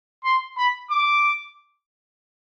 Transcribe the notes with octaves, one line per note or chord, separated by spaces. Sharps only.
C6
B5
D6